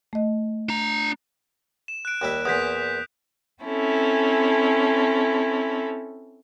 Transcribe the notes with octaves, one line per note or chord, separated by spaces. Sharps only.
A3 D#5
D4 A#5
E7
F#6 D7
D#2 G3 E5
E2 A#2 D#6 G6 B6
C4 C#4 E4 A4